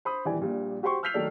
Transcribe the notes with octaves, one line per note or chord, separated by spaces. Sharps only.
C5 B5 D#6
D#1 E3 E4 G4 D5 G#5
A#1 A#2 G3
F#4 G4 C5 C6 C#6
E6 F6 G6 B6 C7 F7
D#3 F#3 A3 A4 D5